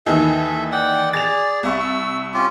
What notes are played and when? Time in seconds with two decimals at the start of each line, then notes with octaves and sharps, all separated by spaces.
0.06 D#2 D#3 E3 A4 E5
0.72 D5 F#5 G5
1.13 G#4 D5 A6 F7
1.63 C2 E5 C#6
1.80 E6
2.34 C#4 F4 G4